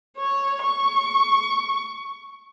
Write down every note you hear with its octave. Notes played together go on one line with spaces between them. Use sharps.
C#5
C#6